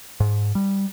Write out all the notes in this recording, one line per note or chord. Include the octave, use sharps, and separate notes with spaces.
G#2
G3